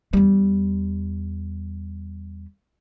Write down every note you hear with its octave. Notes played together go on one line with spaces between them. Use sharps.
E2 G3